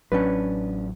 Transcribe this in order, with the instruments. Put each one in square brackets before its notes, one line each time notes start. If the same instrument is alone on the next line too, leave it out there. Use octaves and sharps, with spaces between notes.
[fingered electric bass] A1 F#3 [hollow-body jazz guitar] C#4 D4 B4